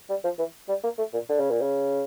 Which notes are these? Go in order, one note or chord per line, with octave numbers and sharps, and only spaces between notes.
G3
F3
E3
G3
A#3
A3
A#2
D3
C#3
A#2
C#3